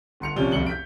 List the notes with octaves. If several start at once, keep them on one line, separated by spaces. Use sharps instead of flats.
G1 C6 C#7 F7
A#1 C3 F3 C#4 G7
D1 C2 F2 C#7 F#7 G7
G6 B6 D7